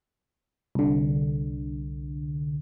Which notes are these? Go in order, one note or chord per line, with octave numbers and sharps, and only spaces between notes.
C2 D3